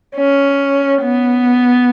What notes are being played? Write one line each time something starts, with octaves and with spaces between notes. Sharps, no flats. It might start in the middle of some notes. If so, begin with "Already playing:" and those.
C#4
B3